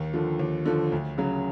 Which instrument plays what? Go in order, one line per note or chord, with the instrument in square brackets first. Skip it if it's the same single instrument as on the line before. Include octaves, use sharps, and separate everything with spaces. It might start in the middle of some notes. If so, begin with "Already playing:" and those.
Already playing: [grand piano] D#2
D3 F3
D#2
D3 F3
D2
C#3 F#3